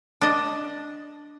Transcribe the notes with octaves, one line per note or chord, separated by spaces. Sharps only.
D4 D#5